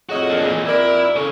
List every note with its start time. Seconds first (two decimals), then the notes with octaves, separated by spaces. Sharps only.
0.09 F2 A2 F#4 G#4 D#5
0.30 A#3 D4
0.45 A#2 E3
0.66 F2 E4 G4 A#4 D5
1.16 C#3 A4 C#5